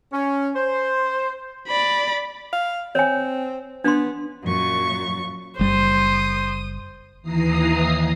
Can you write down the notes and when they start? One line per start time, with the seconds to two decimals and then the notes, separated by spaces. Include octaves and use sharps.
0.12 C#4
0.56 C5
1.68 D5 B5
2.53 F5
2.95 C4 C#5 G#5
3.84 B3 D4 C6
4.44 F#2 A#2 C#6
5.59 F#1 G3 C5 D#6
7.22 D#2 E3 A#5 D#6 C7